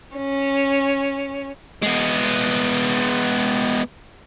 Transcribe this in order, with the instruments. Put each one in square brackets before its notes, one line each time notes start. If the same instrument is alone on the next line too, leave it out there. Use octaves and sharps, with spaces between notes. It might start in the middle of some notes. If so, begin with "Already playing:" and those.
[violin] C#4
[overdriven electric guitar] G#3 B3